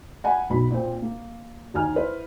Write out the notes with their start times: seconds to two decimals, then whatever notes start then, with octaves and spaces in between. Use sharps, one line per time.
0.24 F#5 G#5 B5
0.50 B1 B2 B5
0.71 A#2 C4
1.02 A#3
1.74 D#2 D#4 G#5 F6
1.95 E4 B4 C5